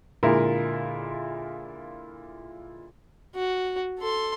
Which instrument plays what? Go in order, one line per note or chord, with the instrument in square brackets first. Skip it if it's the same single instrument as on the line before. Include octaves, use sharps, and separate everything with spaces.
[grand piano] A#2 D3 G#3 E4 F4 A#4
[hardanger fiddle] F#4
A4 C6